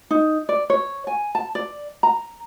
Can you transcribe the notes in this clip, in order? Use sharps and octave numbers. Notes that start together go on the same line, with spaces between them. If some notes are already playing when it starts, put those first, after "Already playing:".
D#4
D5
C#5
G#5
A5
D5
A#5